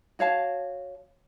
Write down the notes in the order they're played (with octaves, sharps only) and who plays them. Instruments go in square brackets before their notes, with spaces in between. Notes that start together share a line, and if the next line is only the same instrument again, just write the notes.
[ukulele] F#4 C#5 F5 A5